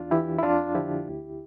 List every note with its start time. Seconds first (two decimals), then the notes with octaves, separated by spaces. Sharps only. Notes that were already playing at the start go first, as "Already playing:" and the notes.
Already playing: E2 D4 F4
0.11 E3 E4 G4
0.39 E4
0.43 F2 D4 F4
0.75 D3 F3 E4 G4
1.08 D2